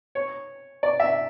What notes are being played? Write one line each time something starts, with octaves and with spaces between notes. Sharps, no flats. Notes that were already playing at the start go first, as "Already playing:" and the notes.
C#5
D5
E5